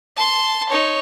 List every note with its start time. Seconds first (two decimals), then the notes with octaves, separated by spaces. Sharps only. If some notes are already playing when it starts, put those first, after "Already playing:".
0.17 A5 C6
0.69 D#4 C#5